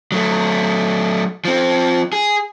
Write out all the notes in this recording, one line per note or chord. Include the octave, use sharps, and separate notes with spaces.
F#3 A3
F3 C4
G#4